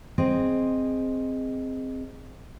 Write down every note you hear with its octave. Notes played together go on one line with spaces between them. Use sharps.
C4 G#4 D#5